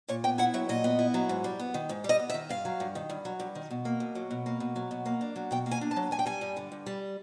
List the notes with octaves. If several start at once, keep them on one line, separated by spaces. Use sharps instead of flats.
A#2 C#5
B3 G5
E4 F#5
F#3 E5
A#2 D#5
B3
E4
F#3
G#2
G3
B3
D#3
G#2
G3 D#5
B3
E5
D#3
G2 F5
F#3
G2
D#3
G2
F#3
G2
D#3
B2
A#3
B2
F#3
B2
A#3
B2
F#3
B2
A#3
D4
F#3
B2 G5
A#3
G#5
D4
A5
F#3
G2 G#5
G5
G3 G#5
G2
D3
G2
G3